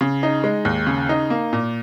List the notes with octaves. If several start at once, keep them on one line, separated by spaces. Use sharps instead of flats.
C#3
D#4
G#3
D#2
C#3
D#4
A#3
A#2